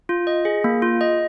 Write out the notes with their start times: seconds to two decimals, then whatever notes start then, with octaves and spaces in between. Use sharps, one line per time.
0.09 F4
0.27 D#5
0.45 G#4
0.64 A#3
0.82 F4
1.01 D#5